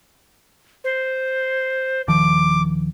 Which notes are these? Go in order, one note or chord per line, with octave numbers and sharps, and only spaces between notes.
C5
D#1 D#3 F3 D6